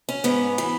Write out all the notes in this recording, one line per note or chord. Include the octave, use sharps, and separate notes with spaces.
C#4
G#2 B3
E3